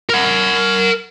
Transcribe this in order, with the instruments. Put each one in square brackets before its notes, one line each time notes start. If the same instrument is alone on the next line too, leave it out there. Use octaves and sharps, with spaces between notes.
[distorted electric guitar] A#4 F#5